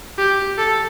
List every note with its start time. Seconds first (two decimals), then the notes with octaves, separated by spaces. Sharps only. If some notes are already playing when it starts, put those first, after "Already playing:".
0.18 G4
0.58 A4